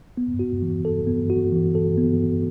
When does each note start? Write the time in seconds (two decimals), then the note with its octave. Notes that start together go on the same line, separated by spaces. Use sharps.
0.17 B3
0.39 F#4
0.62 E3
0.85 A4
1.07 B3
1.30 F#4
1.52 E3
1.75 A4
1.98 B3